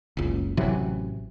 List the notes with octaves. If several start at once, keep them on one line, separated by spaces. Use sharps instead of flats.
F#1 C#2
A1 C3 E3 F#3